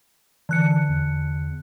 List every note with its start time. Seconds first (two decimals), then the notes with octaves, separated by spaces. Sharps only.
0.49 D3 E3 F#6 C#7
0.88 E2